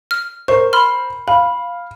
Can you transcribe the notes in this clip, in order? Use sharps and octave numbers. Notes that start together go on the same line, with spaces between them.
F6
A#4 C5 C#6
B5 C6 F6
F5 B5